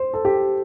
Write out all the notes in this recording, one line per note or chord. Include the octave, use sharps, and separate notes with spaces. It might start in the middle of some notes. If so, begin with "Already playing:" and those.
Already playing: C5
A4
G4